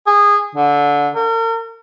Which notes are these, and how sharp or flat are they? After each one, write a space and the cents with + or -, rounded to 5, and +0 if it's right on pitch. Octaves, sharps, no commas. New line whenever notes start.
G#4 -20
D3 -20
A#4 -40